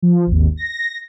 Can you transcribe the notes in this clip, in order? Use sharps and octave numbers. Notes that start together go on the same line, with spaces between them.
F3
G#1 D#2
A#6